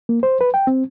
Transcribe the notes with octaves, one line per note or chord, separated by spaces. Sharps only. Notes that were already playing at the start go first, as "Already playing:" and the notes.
A#3
C5
B4
G5
C4